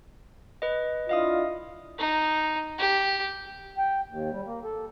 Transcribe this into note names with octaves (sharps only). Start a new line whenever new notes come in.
B4 D#5
D4 E4 F4 D#5 F5 D#6
D#4
G4
G5
D#2
G3
A#3
A4